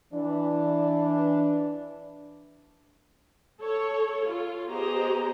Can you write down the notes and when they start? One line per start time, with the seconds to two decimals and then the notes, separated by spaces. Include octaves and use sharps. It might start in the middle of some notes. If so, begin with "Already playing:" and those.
0.14 E3 D4
3.60 A4 C#5
4.28 F4
4.70 B3 G4 G#4 C5 D#5 A#5